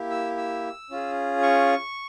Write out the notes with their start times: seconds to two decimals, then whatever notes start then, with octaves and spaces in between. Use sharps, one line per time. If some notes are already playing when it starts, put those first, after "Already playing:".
Already playing: A#3 E4 G4
0.11 E6
0.37 E6
0.90 C#4 F4 G#4
1.43 C#6